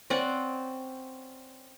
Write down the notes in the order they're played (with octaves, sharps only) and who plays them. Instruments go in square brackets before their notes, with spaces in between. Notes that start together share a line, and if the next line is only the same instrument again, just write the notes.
[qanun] C4 C#4 D5 F#5